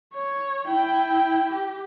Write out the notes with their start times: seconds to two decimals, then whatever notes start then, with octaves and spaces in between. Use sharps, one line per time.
0.14 C#5
0.66 E4 G5
1.52 G4